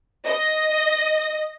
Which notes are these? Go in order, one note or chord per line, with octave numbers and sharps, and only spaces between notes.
D#5